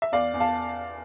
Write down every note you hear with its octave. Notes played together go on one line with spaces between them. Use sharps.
E5
E2 D5 F5
E2
F5 A5